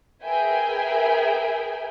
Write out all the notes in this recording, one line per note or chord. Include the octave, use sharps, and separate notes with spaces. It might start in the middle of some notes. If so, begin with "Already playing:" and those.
G#4 A#4 B4 E5 G5 G#5